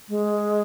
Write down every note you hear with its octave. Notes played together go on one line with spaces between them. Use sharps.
G#3